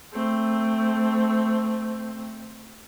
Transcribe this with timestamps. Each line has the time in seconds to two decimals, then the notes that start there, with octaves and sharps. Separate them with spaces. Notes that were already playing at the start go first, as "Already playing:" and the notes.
0.12 A3 C4